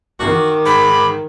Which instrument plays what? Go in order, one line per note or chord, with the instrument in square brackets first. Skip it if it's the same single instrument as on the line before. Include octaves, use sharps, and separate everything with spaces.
[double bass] D#3 [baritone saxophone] F#4 [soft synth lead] D6
[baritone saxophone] G#2 [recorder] B5